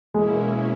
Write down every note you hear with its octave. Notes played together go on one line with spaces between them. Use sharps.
B2 G#3 A#3 C#4 E4